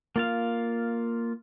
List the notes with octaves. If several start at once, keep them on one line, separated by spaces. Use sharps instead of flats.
A#3 F4 F5